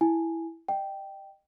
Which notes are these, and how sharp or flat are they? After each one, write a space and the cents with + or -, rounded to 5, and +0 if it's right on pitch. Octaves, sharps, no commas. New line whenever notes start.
E4 +0 G#5 +0
D#5 -30 G5 -5